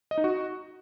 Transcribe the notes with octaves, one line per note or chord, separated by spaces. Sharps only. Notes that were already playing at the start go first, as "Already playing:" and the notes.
D#5
D#4
F#4